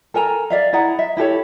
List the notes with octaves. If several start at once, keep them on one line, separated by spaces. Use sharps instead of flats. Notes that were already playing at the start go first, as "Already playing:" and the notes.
A4 A#4 G#5 A#5
D5 E5 F5
E4 G#4 F#5 A#5
E5
E4 G4 A4 C#5